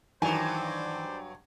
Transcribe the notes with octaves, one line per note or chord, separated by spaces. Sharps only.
G2 D#3 E3 F#3 D#4 C5 D5 G#5